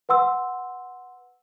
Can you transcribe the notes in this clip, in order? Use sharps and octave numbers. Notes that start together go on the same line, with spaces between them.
B4 F#5 C6 E6